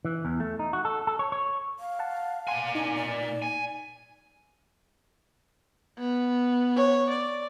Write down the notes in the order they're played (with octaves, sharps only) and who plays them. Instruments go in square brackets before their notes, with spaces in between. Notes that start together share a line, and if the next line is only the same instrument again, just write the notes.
[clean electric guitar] E3
E2
A3
D#4
F#4
A4
A4
C#5
C#5
[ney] F5
[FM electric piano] F#5 A5
[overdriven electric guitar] A#2 G#5 [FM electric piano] F#5 C6
[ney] D4 [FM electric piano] D#4
[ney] D5
[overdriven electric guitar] G#5
[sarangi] B3
[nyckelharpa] C#5
D5